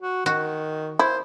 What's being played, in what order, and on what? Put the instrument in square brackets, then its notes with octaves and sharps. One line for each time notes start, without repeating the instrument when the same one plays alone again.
[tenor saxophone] F#4
[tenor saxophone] D#3 [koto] F#4
[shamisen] E4 [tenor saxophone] C5